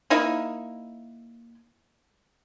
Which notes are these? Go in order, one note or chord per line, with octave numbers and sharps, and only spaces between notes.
A#3 D#4 E4